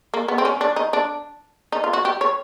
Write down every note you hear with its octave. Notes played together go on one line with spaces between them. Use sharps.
A#3
B3
C4
C#4
D4
D#4
D4
D#4
F4
F#4
G4
C#5